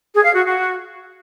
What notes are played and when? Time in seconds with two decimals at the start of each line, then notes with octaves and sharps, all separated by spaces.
0.13 G#4
0.24 F5
0.34 F#4
0.44 F#4